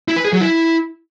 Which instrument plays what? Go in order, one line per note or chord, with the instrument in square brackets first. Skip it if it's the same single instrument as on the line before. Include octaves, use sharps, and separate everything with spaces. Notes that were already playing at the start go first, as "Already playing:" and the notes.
[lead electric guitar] E4
B4
G#4
F#3
E4